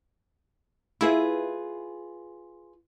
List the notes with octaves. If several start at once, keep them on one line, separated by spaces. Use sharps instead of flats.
E4 F4 G#4 B4